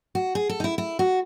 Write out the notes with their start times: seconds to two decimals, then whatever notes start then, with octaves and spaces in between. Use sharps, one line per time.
0.15 F#4
0.35 G#4
0.49 A4
0.60 D#4
0.64 E4
0.78 E4
0.99 F#4